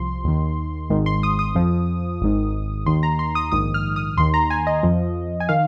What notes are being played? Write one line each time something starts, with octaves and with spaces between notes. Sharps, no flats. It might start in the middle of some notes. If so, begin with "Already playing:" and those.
Already playing: C2 F3 C6
D#2 D#3
G#1 G#2 D#3
C6
D#6
D#6
F2 F3
G#1 G#2 D#3
D#2 D#3 C6
A#5
C6
D#6
A#1 G#2 D#3 D#6
F6
D#6
D#2 D#3 C6
A#5
G#5
D#5
F2 F3
G#5
D#3 F5